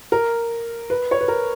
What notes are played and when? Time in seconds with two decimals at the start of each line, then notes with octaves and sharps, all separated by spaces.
0.12 A#4
0.90 B4
1.11 C#5
1.21 B4
1.28 A#4